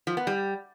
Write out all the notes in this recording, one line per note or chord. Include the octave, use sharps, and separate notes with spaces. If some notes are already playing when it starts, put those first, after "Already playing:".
F3
B3
G3